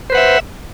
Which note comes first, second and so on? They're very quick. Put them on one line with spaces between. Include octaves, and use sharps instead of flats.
C5 B4 F#5 E5